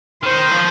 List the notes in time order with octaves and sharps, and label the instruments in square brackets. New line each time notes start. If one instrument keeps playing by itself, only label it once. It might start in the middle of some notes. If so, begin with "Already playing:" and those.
[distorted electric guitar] D#3 [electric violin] C5
[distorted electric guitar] F3